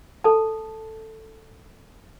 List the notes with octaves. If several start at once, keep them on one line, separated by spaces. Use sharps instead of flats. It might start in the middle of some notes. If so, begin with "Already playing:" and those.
A4 A5